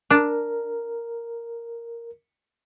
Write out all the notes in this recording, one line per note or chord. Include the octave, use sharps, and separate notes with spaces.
D4 A#4